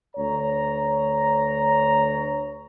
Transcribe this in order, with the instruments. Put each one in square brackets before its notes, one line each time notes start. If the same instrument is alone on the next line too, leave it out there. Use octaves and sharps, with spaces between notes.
[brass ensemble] D2 C#5 A#5